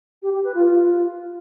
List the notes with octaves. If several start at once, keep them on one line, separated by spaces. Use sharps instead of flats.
G4
G4
B4
F4
F4